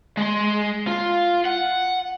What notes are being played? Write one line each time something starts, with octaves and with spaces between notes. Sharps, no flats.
G#3 C6
F4
F#5